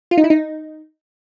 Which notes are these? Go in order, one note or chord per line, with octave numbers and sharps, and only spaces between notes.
F4
D#4
E4
D#4